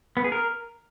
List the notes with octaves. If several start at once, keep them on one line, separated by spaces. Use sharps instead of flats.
B3
G#4
A#4